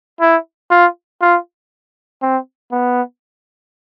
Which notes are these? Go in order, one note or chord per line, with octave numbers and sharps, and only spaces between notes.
E4
F4
F4
C4
B3